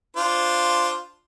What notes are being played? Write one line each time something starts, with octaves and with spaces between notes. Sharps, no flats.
D4 F4 C5